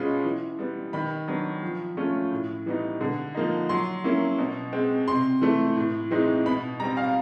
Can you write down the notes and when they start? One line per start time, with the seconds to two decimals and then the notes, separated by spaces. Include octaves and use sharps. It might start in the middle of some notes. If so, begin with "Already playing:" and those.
Already playing: B2 G#3 C#4 F4 B5 C6
0.25 E3
0.59 G3 B3
0.93 D#3 B5
1.28 F#3 B3 D4
1.63 F3
1.97 A3 C#4 F4
2.31 A2
2.66 E3 G3 B3 D#4
3.01 D3
3.35 F3 A#3 D#4
3.69 F#3 C6
4.04 A#3 C#4 E4
4.38 B2
4.73 G#3 C4
5.07 C3 C6
5.42 E3 A3
5.76 A2
6.11 E3 G#3 C4 D#4
6.45 B2 B5
6.80 G3 A#5
6.84 C4
6.97 F5